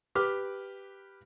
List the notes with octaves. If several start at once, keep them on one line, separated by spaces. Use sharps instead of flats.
G4 B4 D6 F6